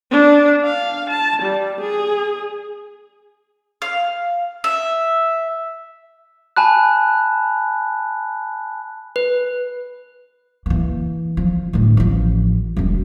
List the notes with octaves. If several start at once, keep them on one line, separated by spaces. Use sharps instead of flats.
D4
F5
A5
G3
G#4
F5
E5
G#5 A5 B5 F#6
B4
E3 A#3
F3
G1 A2
A1 F3
E1 F#2